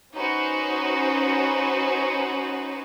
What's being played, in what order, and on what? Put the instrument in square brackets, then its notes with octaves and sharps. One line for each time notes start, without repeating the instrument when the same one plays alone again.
[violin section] C#4 D#4 F#4 B4 C5